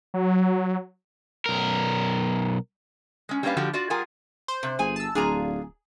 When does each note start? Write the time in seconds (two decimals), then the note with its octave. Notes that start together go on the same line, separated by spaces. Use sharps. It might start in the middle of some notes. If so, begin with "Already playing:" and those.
0.14 F#3
1.46 B1 A#4
3.29 G#3 C#4
3.43 G3 A#3 C#4 D4 B4 F5
3.57 D3 F3 G3 F#4 G4
3.73 F4 F#4 D5
3.90 G3 F4 G#4 A#4 F#5 G#5
4.48 C5
4.63 C3
4.79 G1 G#4 G#5
4.96 A5 E6
5.15 D1 D4 F4 G#4 G#5 A#5